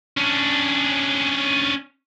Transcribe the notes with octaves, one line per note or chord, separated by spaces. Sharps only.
C#4 D4